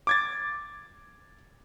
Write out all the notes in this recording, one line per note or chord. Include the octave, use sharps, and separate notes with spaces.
D6 G#6 A6